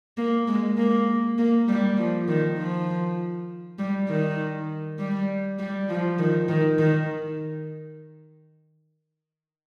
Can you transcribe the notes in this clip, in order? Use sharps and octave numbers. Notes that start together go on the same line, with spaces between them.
A#3
G#3
A#3
A#3
G3
F3
D#3
F3
G3
D#3
G3
G3
F3
D#3
D#3
D#3